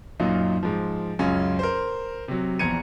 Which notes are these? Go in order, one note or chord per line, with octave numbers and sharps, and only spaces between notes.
F#2 A#2 F#3 D#4 F4
G#2 F3
C#2 F#2 C#4 F4
A#4 C5
C3 F#3
A#1 E2 A#5 G#6 C#7 D#7